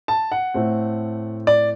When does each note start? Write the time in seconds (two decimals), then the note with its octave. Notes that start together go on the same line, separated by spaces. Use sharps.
0.08 A5
0.32 F#5
0.54 A2 A3 C4
1.47 D5